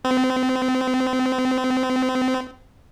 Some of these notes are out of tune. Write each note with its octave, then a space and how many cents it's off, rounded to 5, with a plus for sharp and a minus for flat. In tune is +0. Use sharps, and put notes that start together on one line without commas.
C4 -30